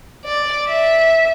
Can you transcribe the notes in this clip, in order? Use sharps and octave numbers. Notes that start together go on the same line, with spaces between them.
D5
E5